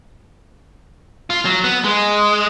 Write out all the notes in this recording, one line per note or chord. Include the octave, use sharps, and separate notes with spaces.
F4
F#3
B3
G#3